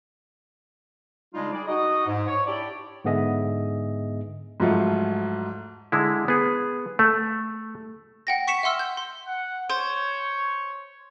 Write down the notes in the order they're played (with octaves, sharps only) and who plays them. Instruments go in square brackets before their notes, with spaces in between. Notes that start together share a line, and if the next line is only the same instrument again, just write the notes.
[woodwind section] C#3 G3 G#3 D4 D#4 F4
G3 G#4 D5
D#4 F#4 D#5
G#2
C#5
D4 E4 G4 D5
[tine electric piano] G#2 D3 B3 G#4 D#5 E5
[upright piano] G#2 F3 F#3 A3 F4
[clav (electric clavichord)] D3 G#3 E4
B3 G#4
A3
[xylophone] F#5 G5 A#6
C#6 B6 C#7 E7
E5 F#5 C6 E6 F6
G6
C6
[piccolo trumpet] F#5
[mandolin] C5 [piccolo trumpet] C#5